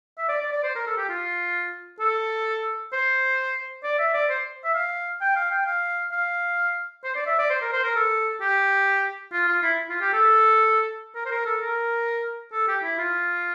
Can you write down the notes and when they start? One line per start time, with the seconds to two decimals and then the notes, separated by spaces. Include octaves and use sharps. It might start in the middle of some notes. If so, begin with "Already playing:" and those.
0.18 E5
0.28 D5
0.41 D5
0.52 D5
0.63 C5
0.75 A#4
0.87 A4
0.97 G4
1.09 F4
2.00 A4
2.93 C5
3.83 D5
3.98 E5
4.13 D5
4.30 C5
4.64 E5
4.74 F5
5.21 G5
5.36 F5
5.51 G5
5.66 F5
6.12 F5
7.04 C5
7.15 D5
7.27 E5
7.39 D5
7.50 C5
7.62 A#4
7.72 C5
7.84 A#4
7.96 A4
8.41 G4
9.33 F4
9.48 F4
9.63 E4
9.90 F4
10.01 G4
10.13 A4
11.15 A#4
11.26 C5
11.31 A#4
11.45 A4
11.61 A#4
12.52 A4
12.68 G4
12.83 E4
12.98 F4